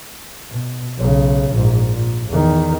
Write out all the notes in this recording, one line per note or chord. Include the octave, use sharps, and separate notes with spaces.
B2
B1 C#3
A#1 G#2
A#2
E2 D#3